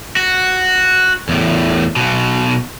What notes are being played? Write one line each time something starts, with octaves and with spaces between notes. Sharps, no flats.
F#4
E2 A2
B1 B2